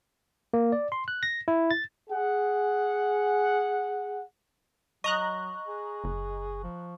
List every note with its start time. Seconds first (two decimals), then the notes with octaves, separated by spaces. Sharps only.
0.53 A#3
0.72 D5
0.92 C6
1.08 F#6
1.23 A#6
1.48 E4
1.71 A6
2.10 G#4 F#5
5.04 F#3 D#5 A#5 C#6 F#6
5.67 G#4
6.04 F#1
6.63 F3